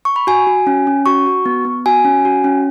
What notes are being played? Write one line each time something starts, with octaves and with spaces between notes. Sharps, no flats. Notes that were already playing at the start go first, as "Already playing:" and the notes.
C#6
B5
F#4 G#5
F#4
C#4
C#4
F#4 C#6
F#4
B3
B3
F#4 G#5
C#4
F#4
C#4